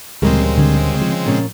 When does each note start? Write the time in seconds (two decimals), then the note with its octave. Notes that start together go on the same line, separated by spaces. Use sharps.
0.22 D2 A#2 C#3 E3 G3 G#3 C4 A#4
0.58 D3
1.02 F3
1.26 A#2 C#4